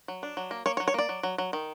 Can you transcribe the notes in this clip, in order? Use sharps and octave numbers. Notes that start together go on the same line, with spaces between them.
F#3
D4
F#3
A#3
A#3 C#5
C#5
F#3
C#5
A#3 D5
F#3
F#3
F#3
D#3